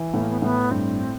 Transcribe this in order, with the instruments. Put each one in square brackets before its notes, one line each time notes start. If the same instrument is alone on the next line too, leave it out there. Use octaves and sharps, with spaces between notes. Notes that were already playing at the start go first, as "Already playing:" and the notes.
Already playing: [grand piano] E3
[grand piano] A2 [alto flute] B3
[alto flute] A#3
B3
[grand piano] A2 [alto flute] B3
[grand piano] G2 [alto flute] C4